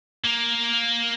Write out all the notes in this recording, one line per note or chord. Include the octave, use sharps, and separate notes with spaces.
A#3 A#4